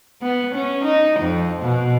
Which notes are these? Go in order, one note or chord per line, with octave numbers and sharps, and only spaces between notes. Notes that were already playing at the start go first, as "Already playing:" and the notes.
B3
C#4
D#4
F2
B2